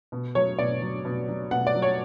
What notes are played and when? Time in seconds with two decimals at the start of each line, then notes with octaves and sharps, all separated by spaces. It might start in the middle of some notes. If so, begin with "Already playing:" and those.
0.12 B2
0.35 F#3 C#5
0.59 B2 D5
0.82 F#3
1.05 B2
1.28 F#3
1.51 B2 F#5
1.67 D5
1.75 F#3
1.82 C#5